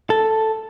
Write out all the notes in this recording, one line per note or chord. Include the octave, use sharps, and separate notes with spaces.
A4